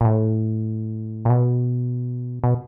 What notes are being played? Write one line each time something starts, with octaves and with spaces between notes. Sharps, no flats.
A#2
A2
A#2
B2
B2